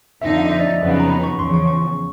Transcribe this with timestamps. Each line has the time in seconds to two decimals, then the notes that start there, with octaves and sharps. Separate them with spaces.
0.22 F2 D3 F3 A#3 D#4 E5
0.37 F5
0.46 D#5
0.52 E5
0.60 D5
0.65 D#5
0.80 F2 C#3 F#3 B3 D#4 D#5
0.89 F5
1.00 A#5
1.09 B5
1.24 C#6
1.39 E2 C#3 F3 C6
1.54 C#6
1.67 C#6